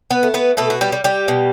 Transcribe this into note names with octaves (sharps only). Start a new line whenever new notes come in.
B3 B4
A3
B3 B4
B2 A3 A4
F#4
G3 G4
G3
G3 G4
B2